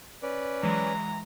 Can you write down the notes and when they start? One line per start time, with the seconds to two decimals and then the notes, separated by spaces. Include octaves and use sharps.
0.23 C#4 B4 D5
0.63 E3 F#3 G#3 A#5